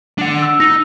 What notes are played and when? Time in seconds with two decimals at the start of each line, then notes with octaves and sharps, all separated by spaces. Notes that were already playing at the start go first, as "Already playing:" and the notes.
0.18 D4 F#5
0.42 E6
0.60 D#4 A#6